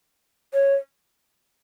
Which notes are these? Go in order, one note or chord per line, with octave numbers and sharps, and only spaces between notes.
C#5